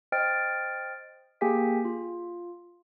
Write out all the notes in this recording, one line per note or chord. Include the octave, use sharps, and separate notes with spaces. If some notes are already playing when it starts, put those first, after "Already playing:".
C5 D#5 G5 F6 A6 D7
A#3 G4 G#4 G5 G#5 B6
F4